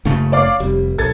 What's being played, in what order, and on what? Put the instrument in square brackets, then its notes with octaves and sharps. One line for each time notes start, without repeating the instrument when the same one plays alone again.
[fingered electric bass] F#1 C#3 A3
[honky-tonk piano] C#5 D5 F5
[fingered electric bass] F1 [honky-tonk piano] G3
[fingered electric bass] B1 [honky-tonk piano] A4 G#6 A6